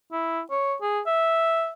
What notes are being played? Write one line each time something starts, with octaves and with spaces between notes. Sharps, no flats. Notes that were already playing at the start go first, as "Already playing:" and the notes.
E4
C#5
G#4
E5